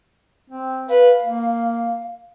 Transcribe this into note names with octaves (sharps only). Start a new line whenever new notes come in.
C4
B4 F5
A#3